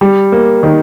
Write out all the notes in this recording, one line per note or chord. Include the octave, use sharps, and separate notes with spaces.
G3
A#3
D#3